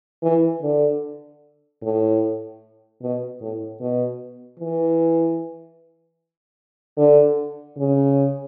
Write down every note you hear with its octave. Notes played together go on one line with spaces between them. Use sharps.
E3
D3
A2
B2
A2
B2
E3
D3
C#3